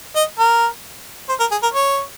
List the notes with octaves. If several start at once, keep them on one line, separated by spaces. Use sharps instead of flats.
D#5
A#4
C5
A#4
G#4
A#4
C#5